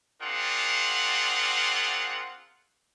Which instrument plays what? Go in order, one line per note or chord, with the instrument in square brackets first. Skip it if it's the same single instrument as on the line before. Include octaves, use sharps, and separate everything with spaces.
[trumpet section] C4 D4 F4 G#4 A#4 F#5